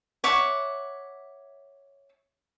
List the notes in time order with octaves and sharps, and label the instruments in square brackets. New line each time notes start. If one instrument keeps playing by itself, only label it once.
[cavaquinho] C#5 E5 F#5 D6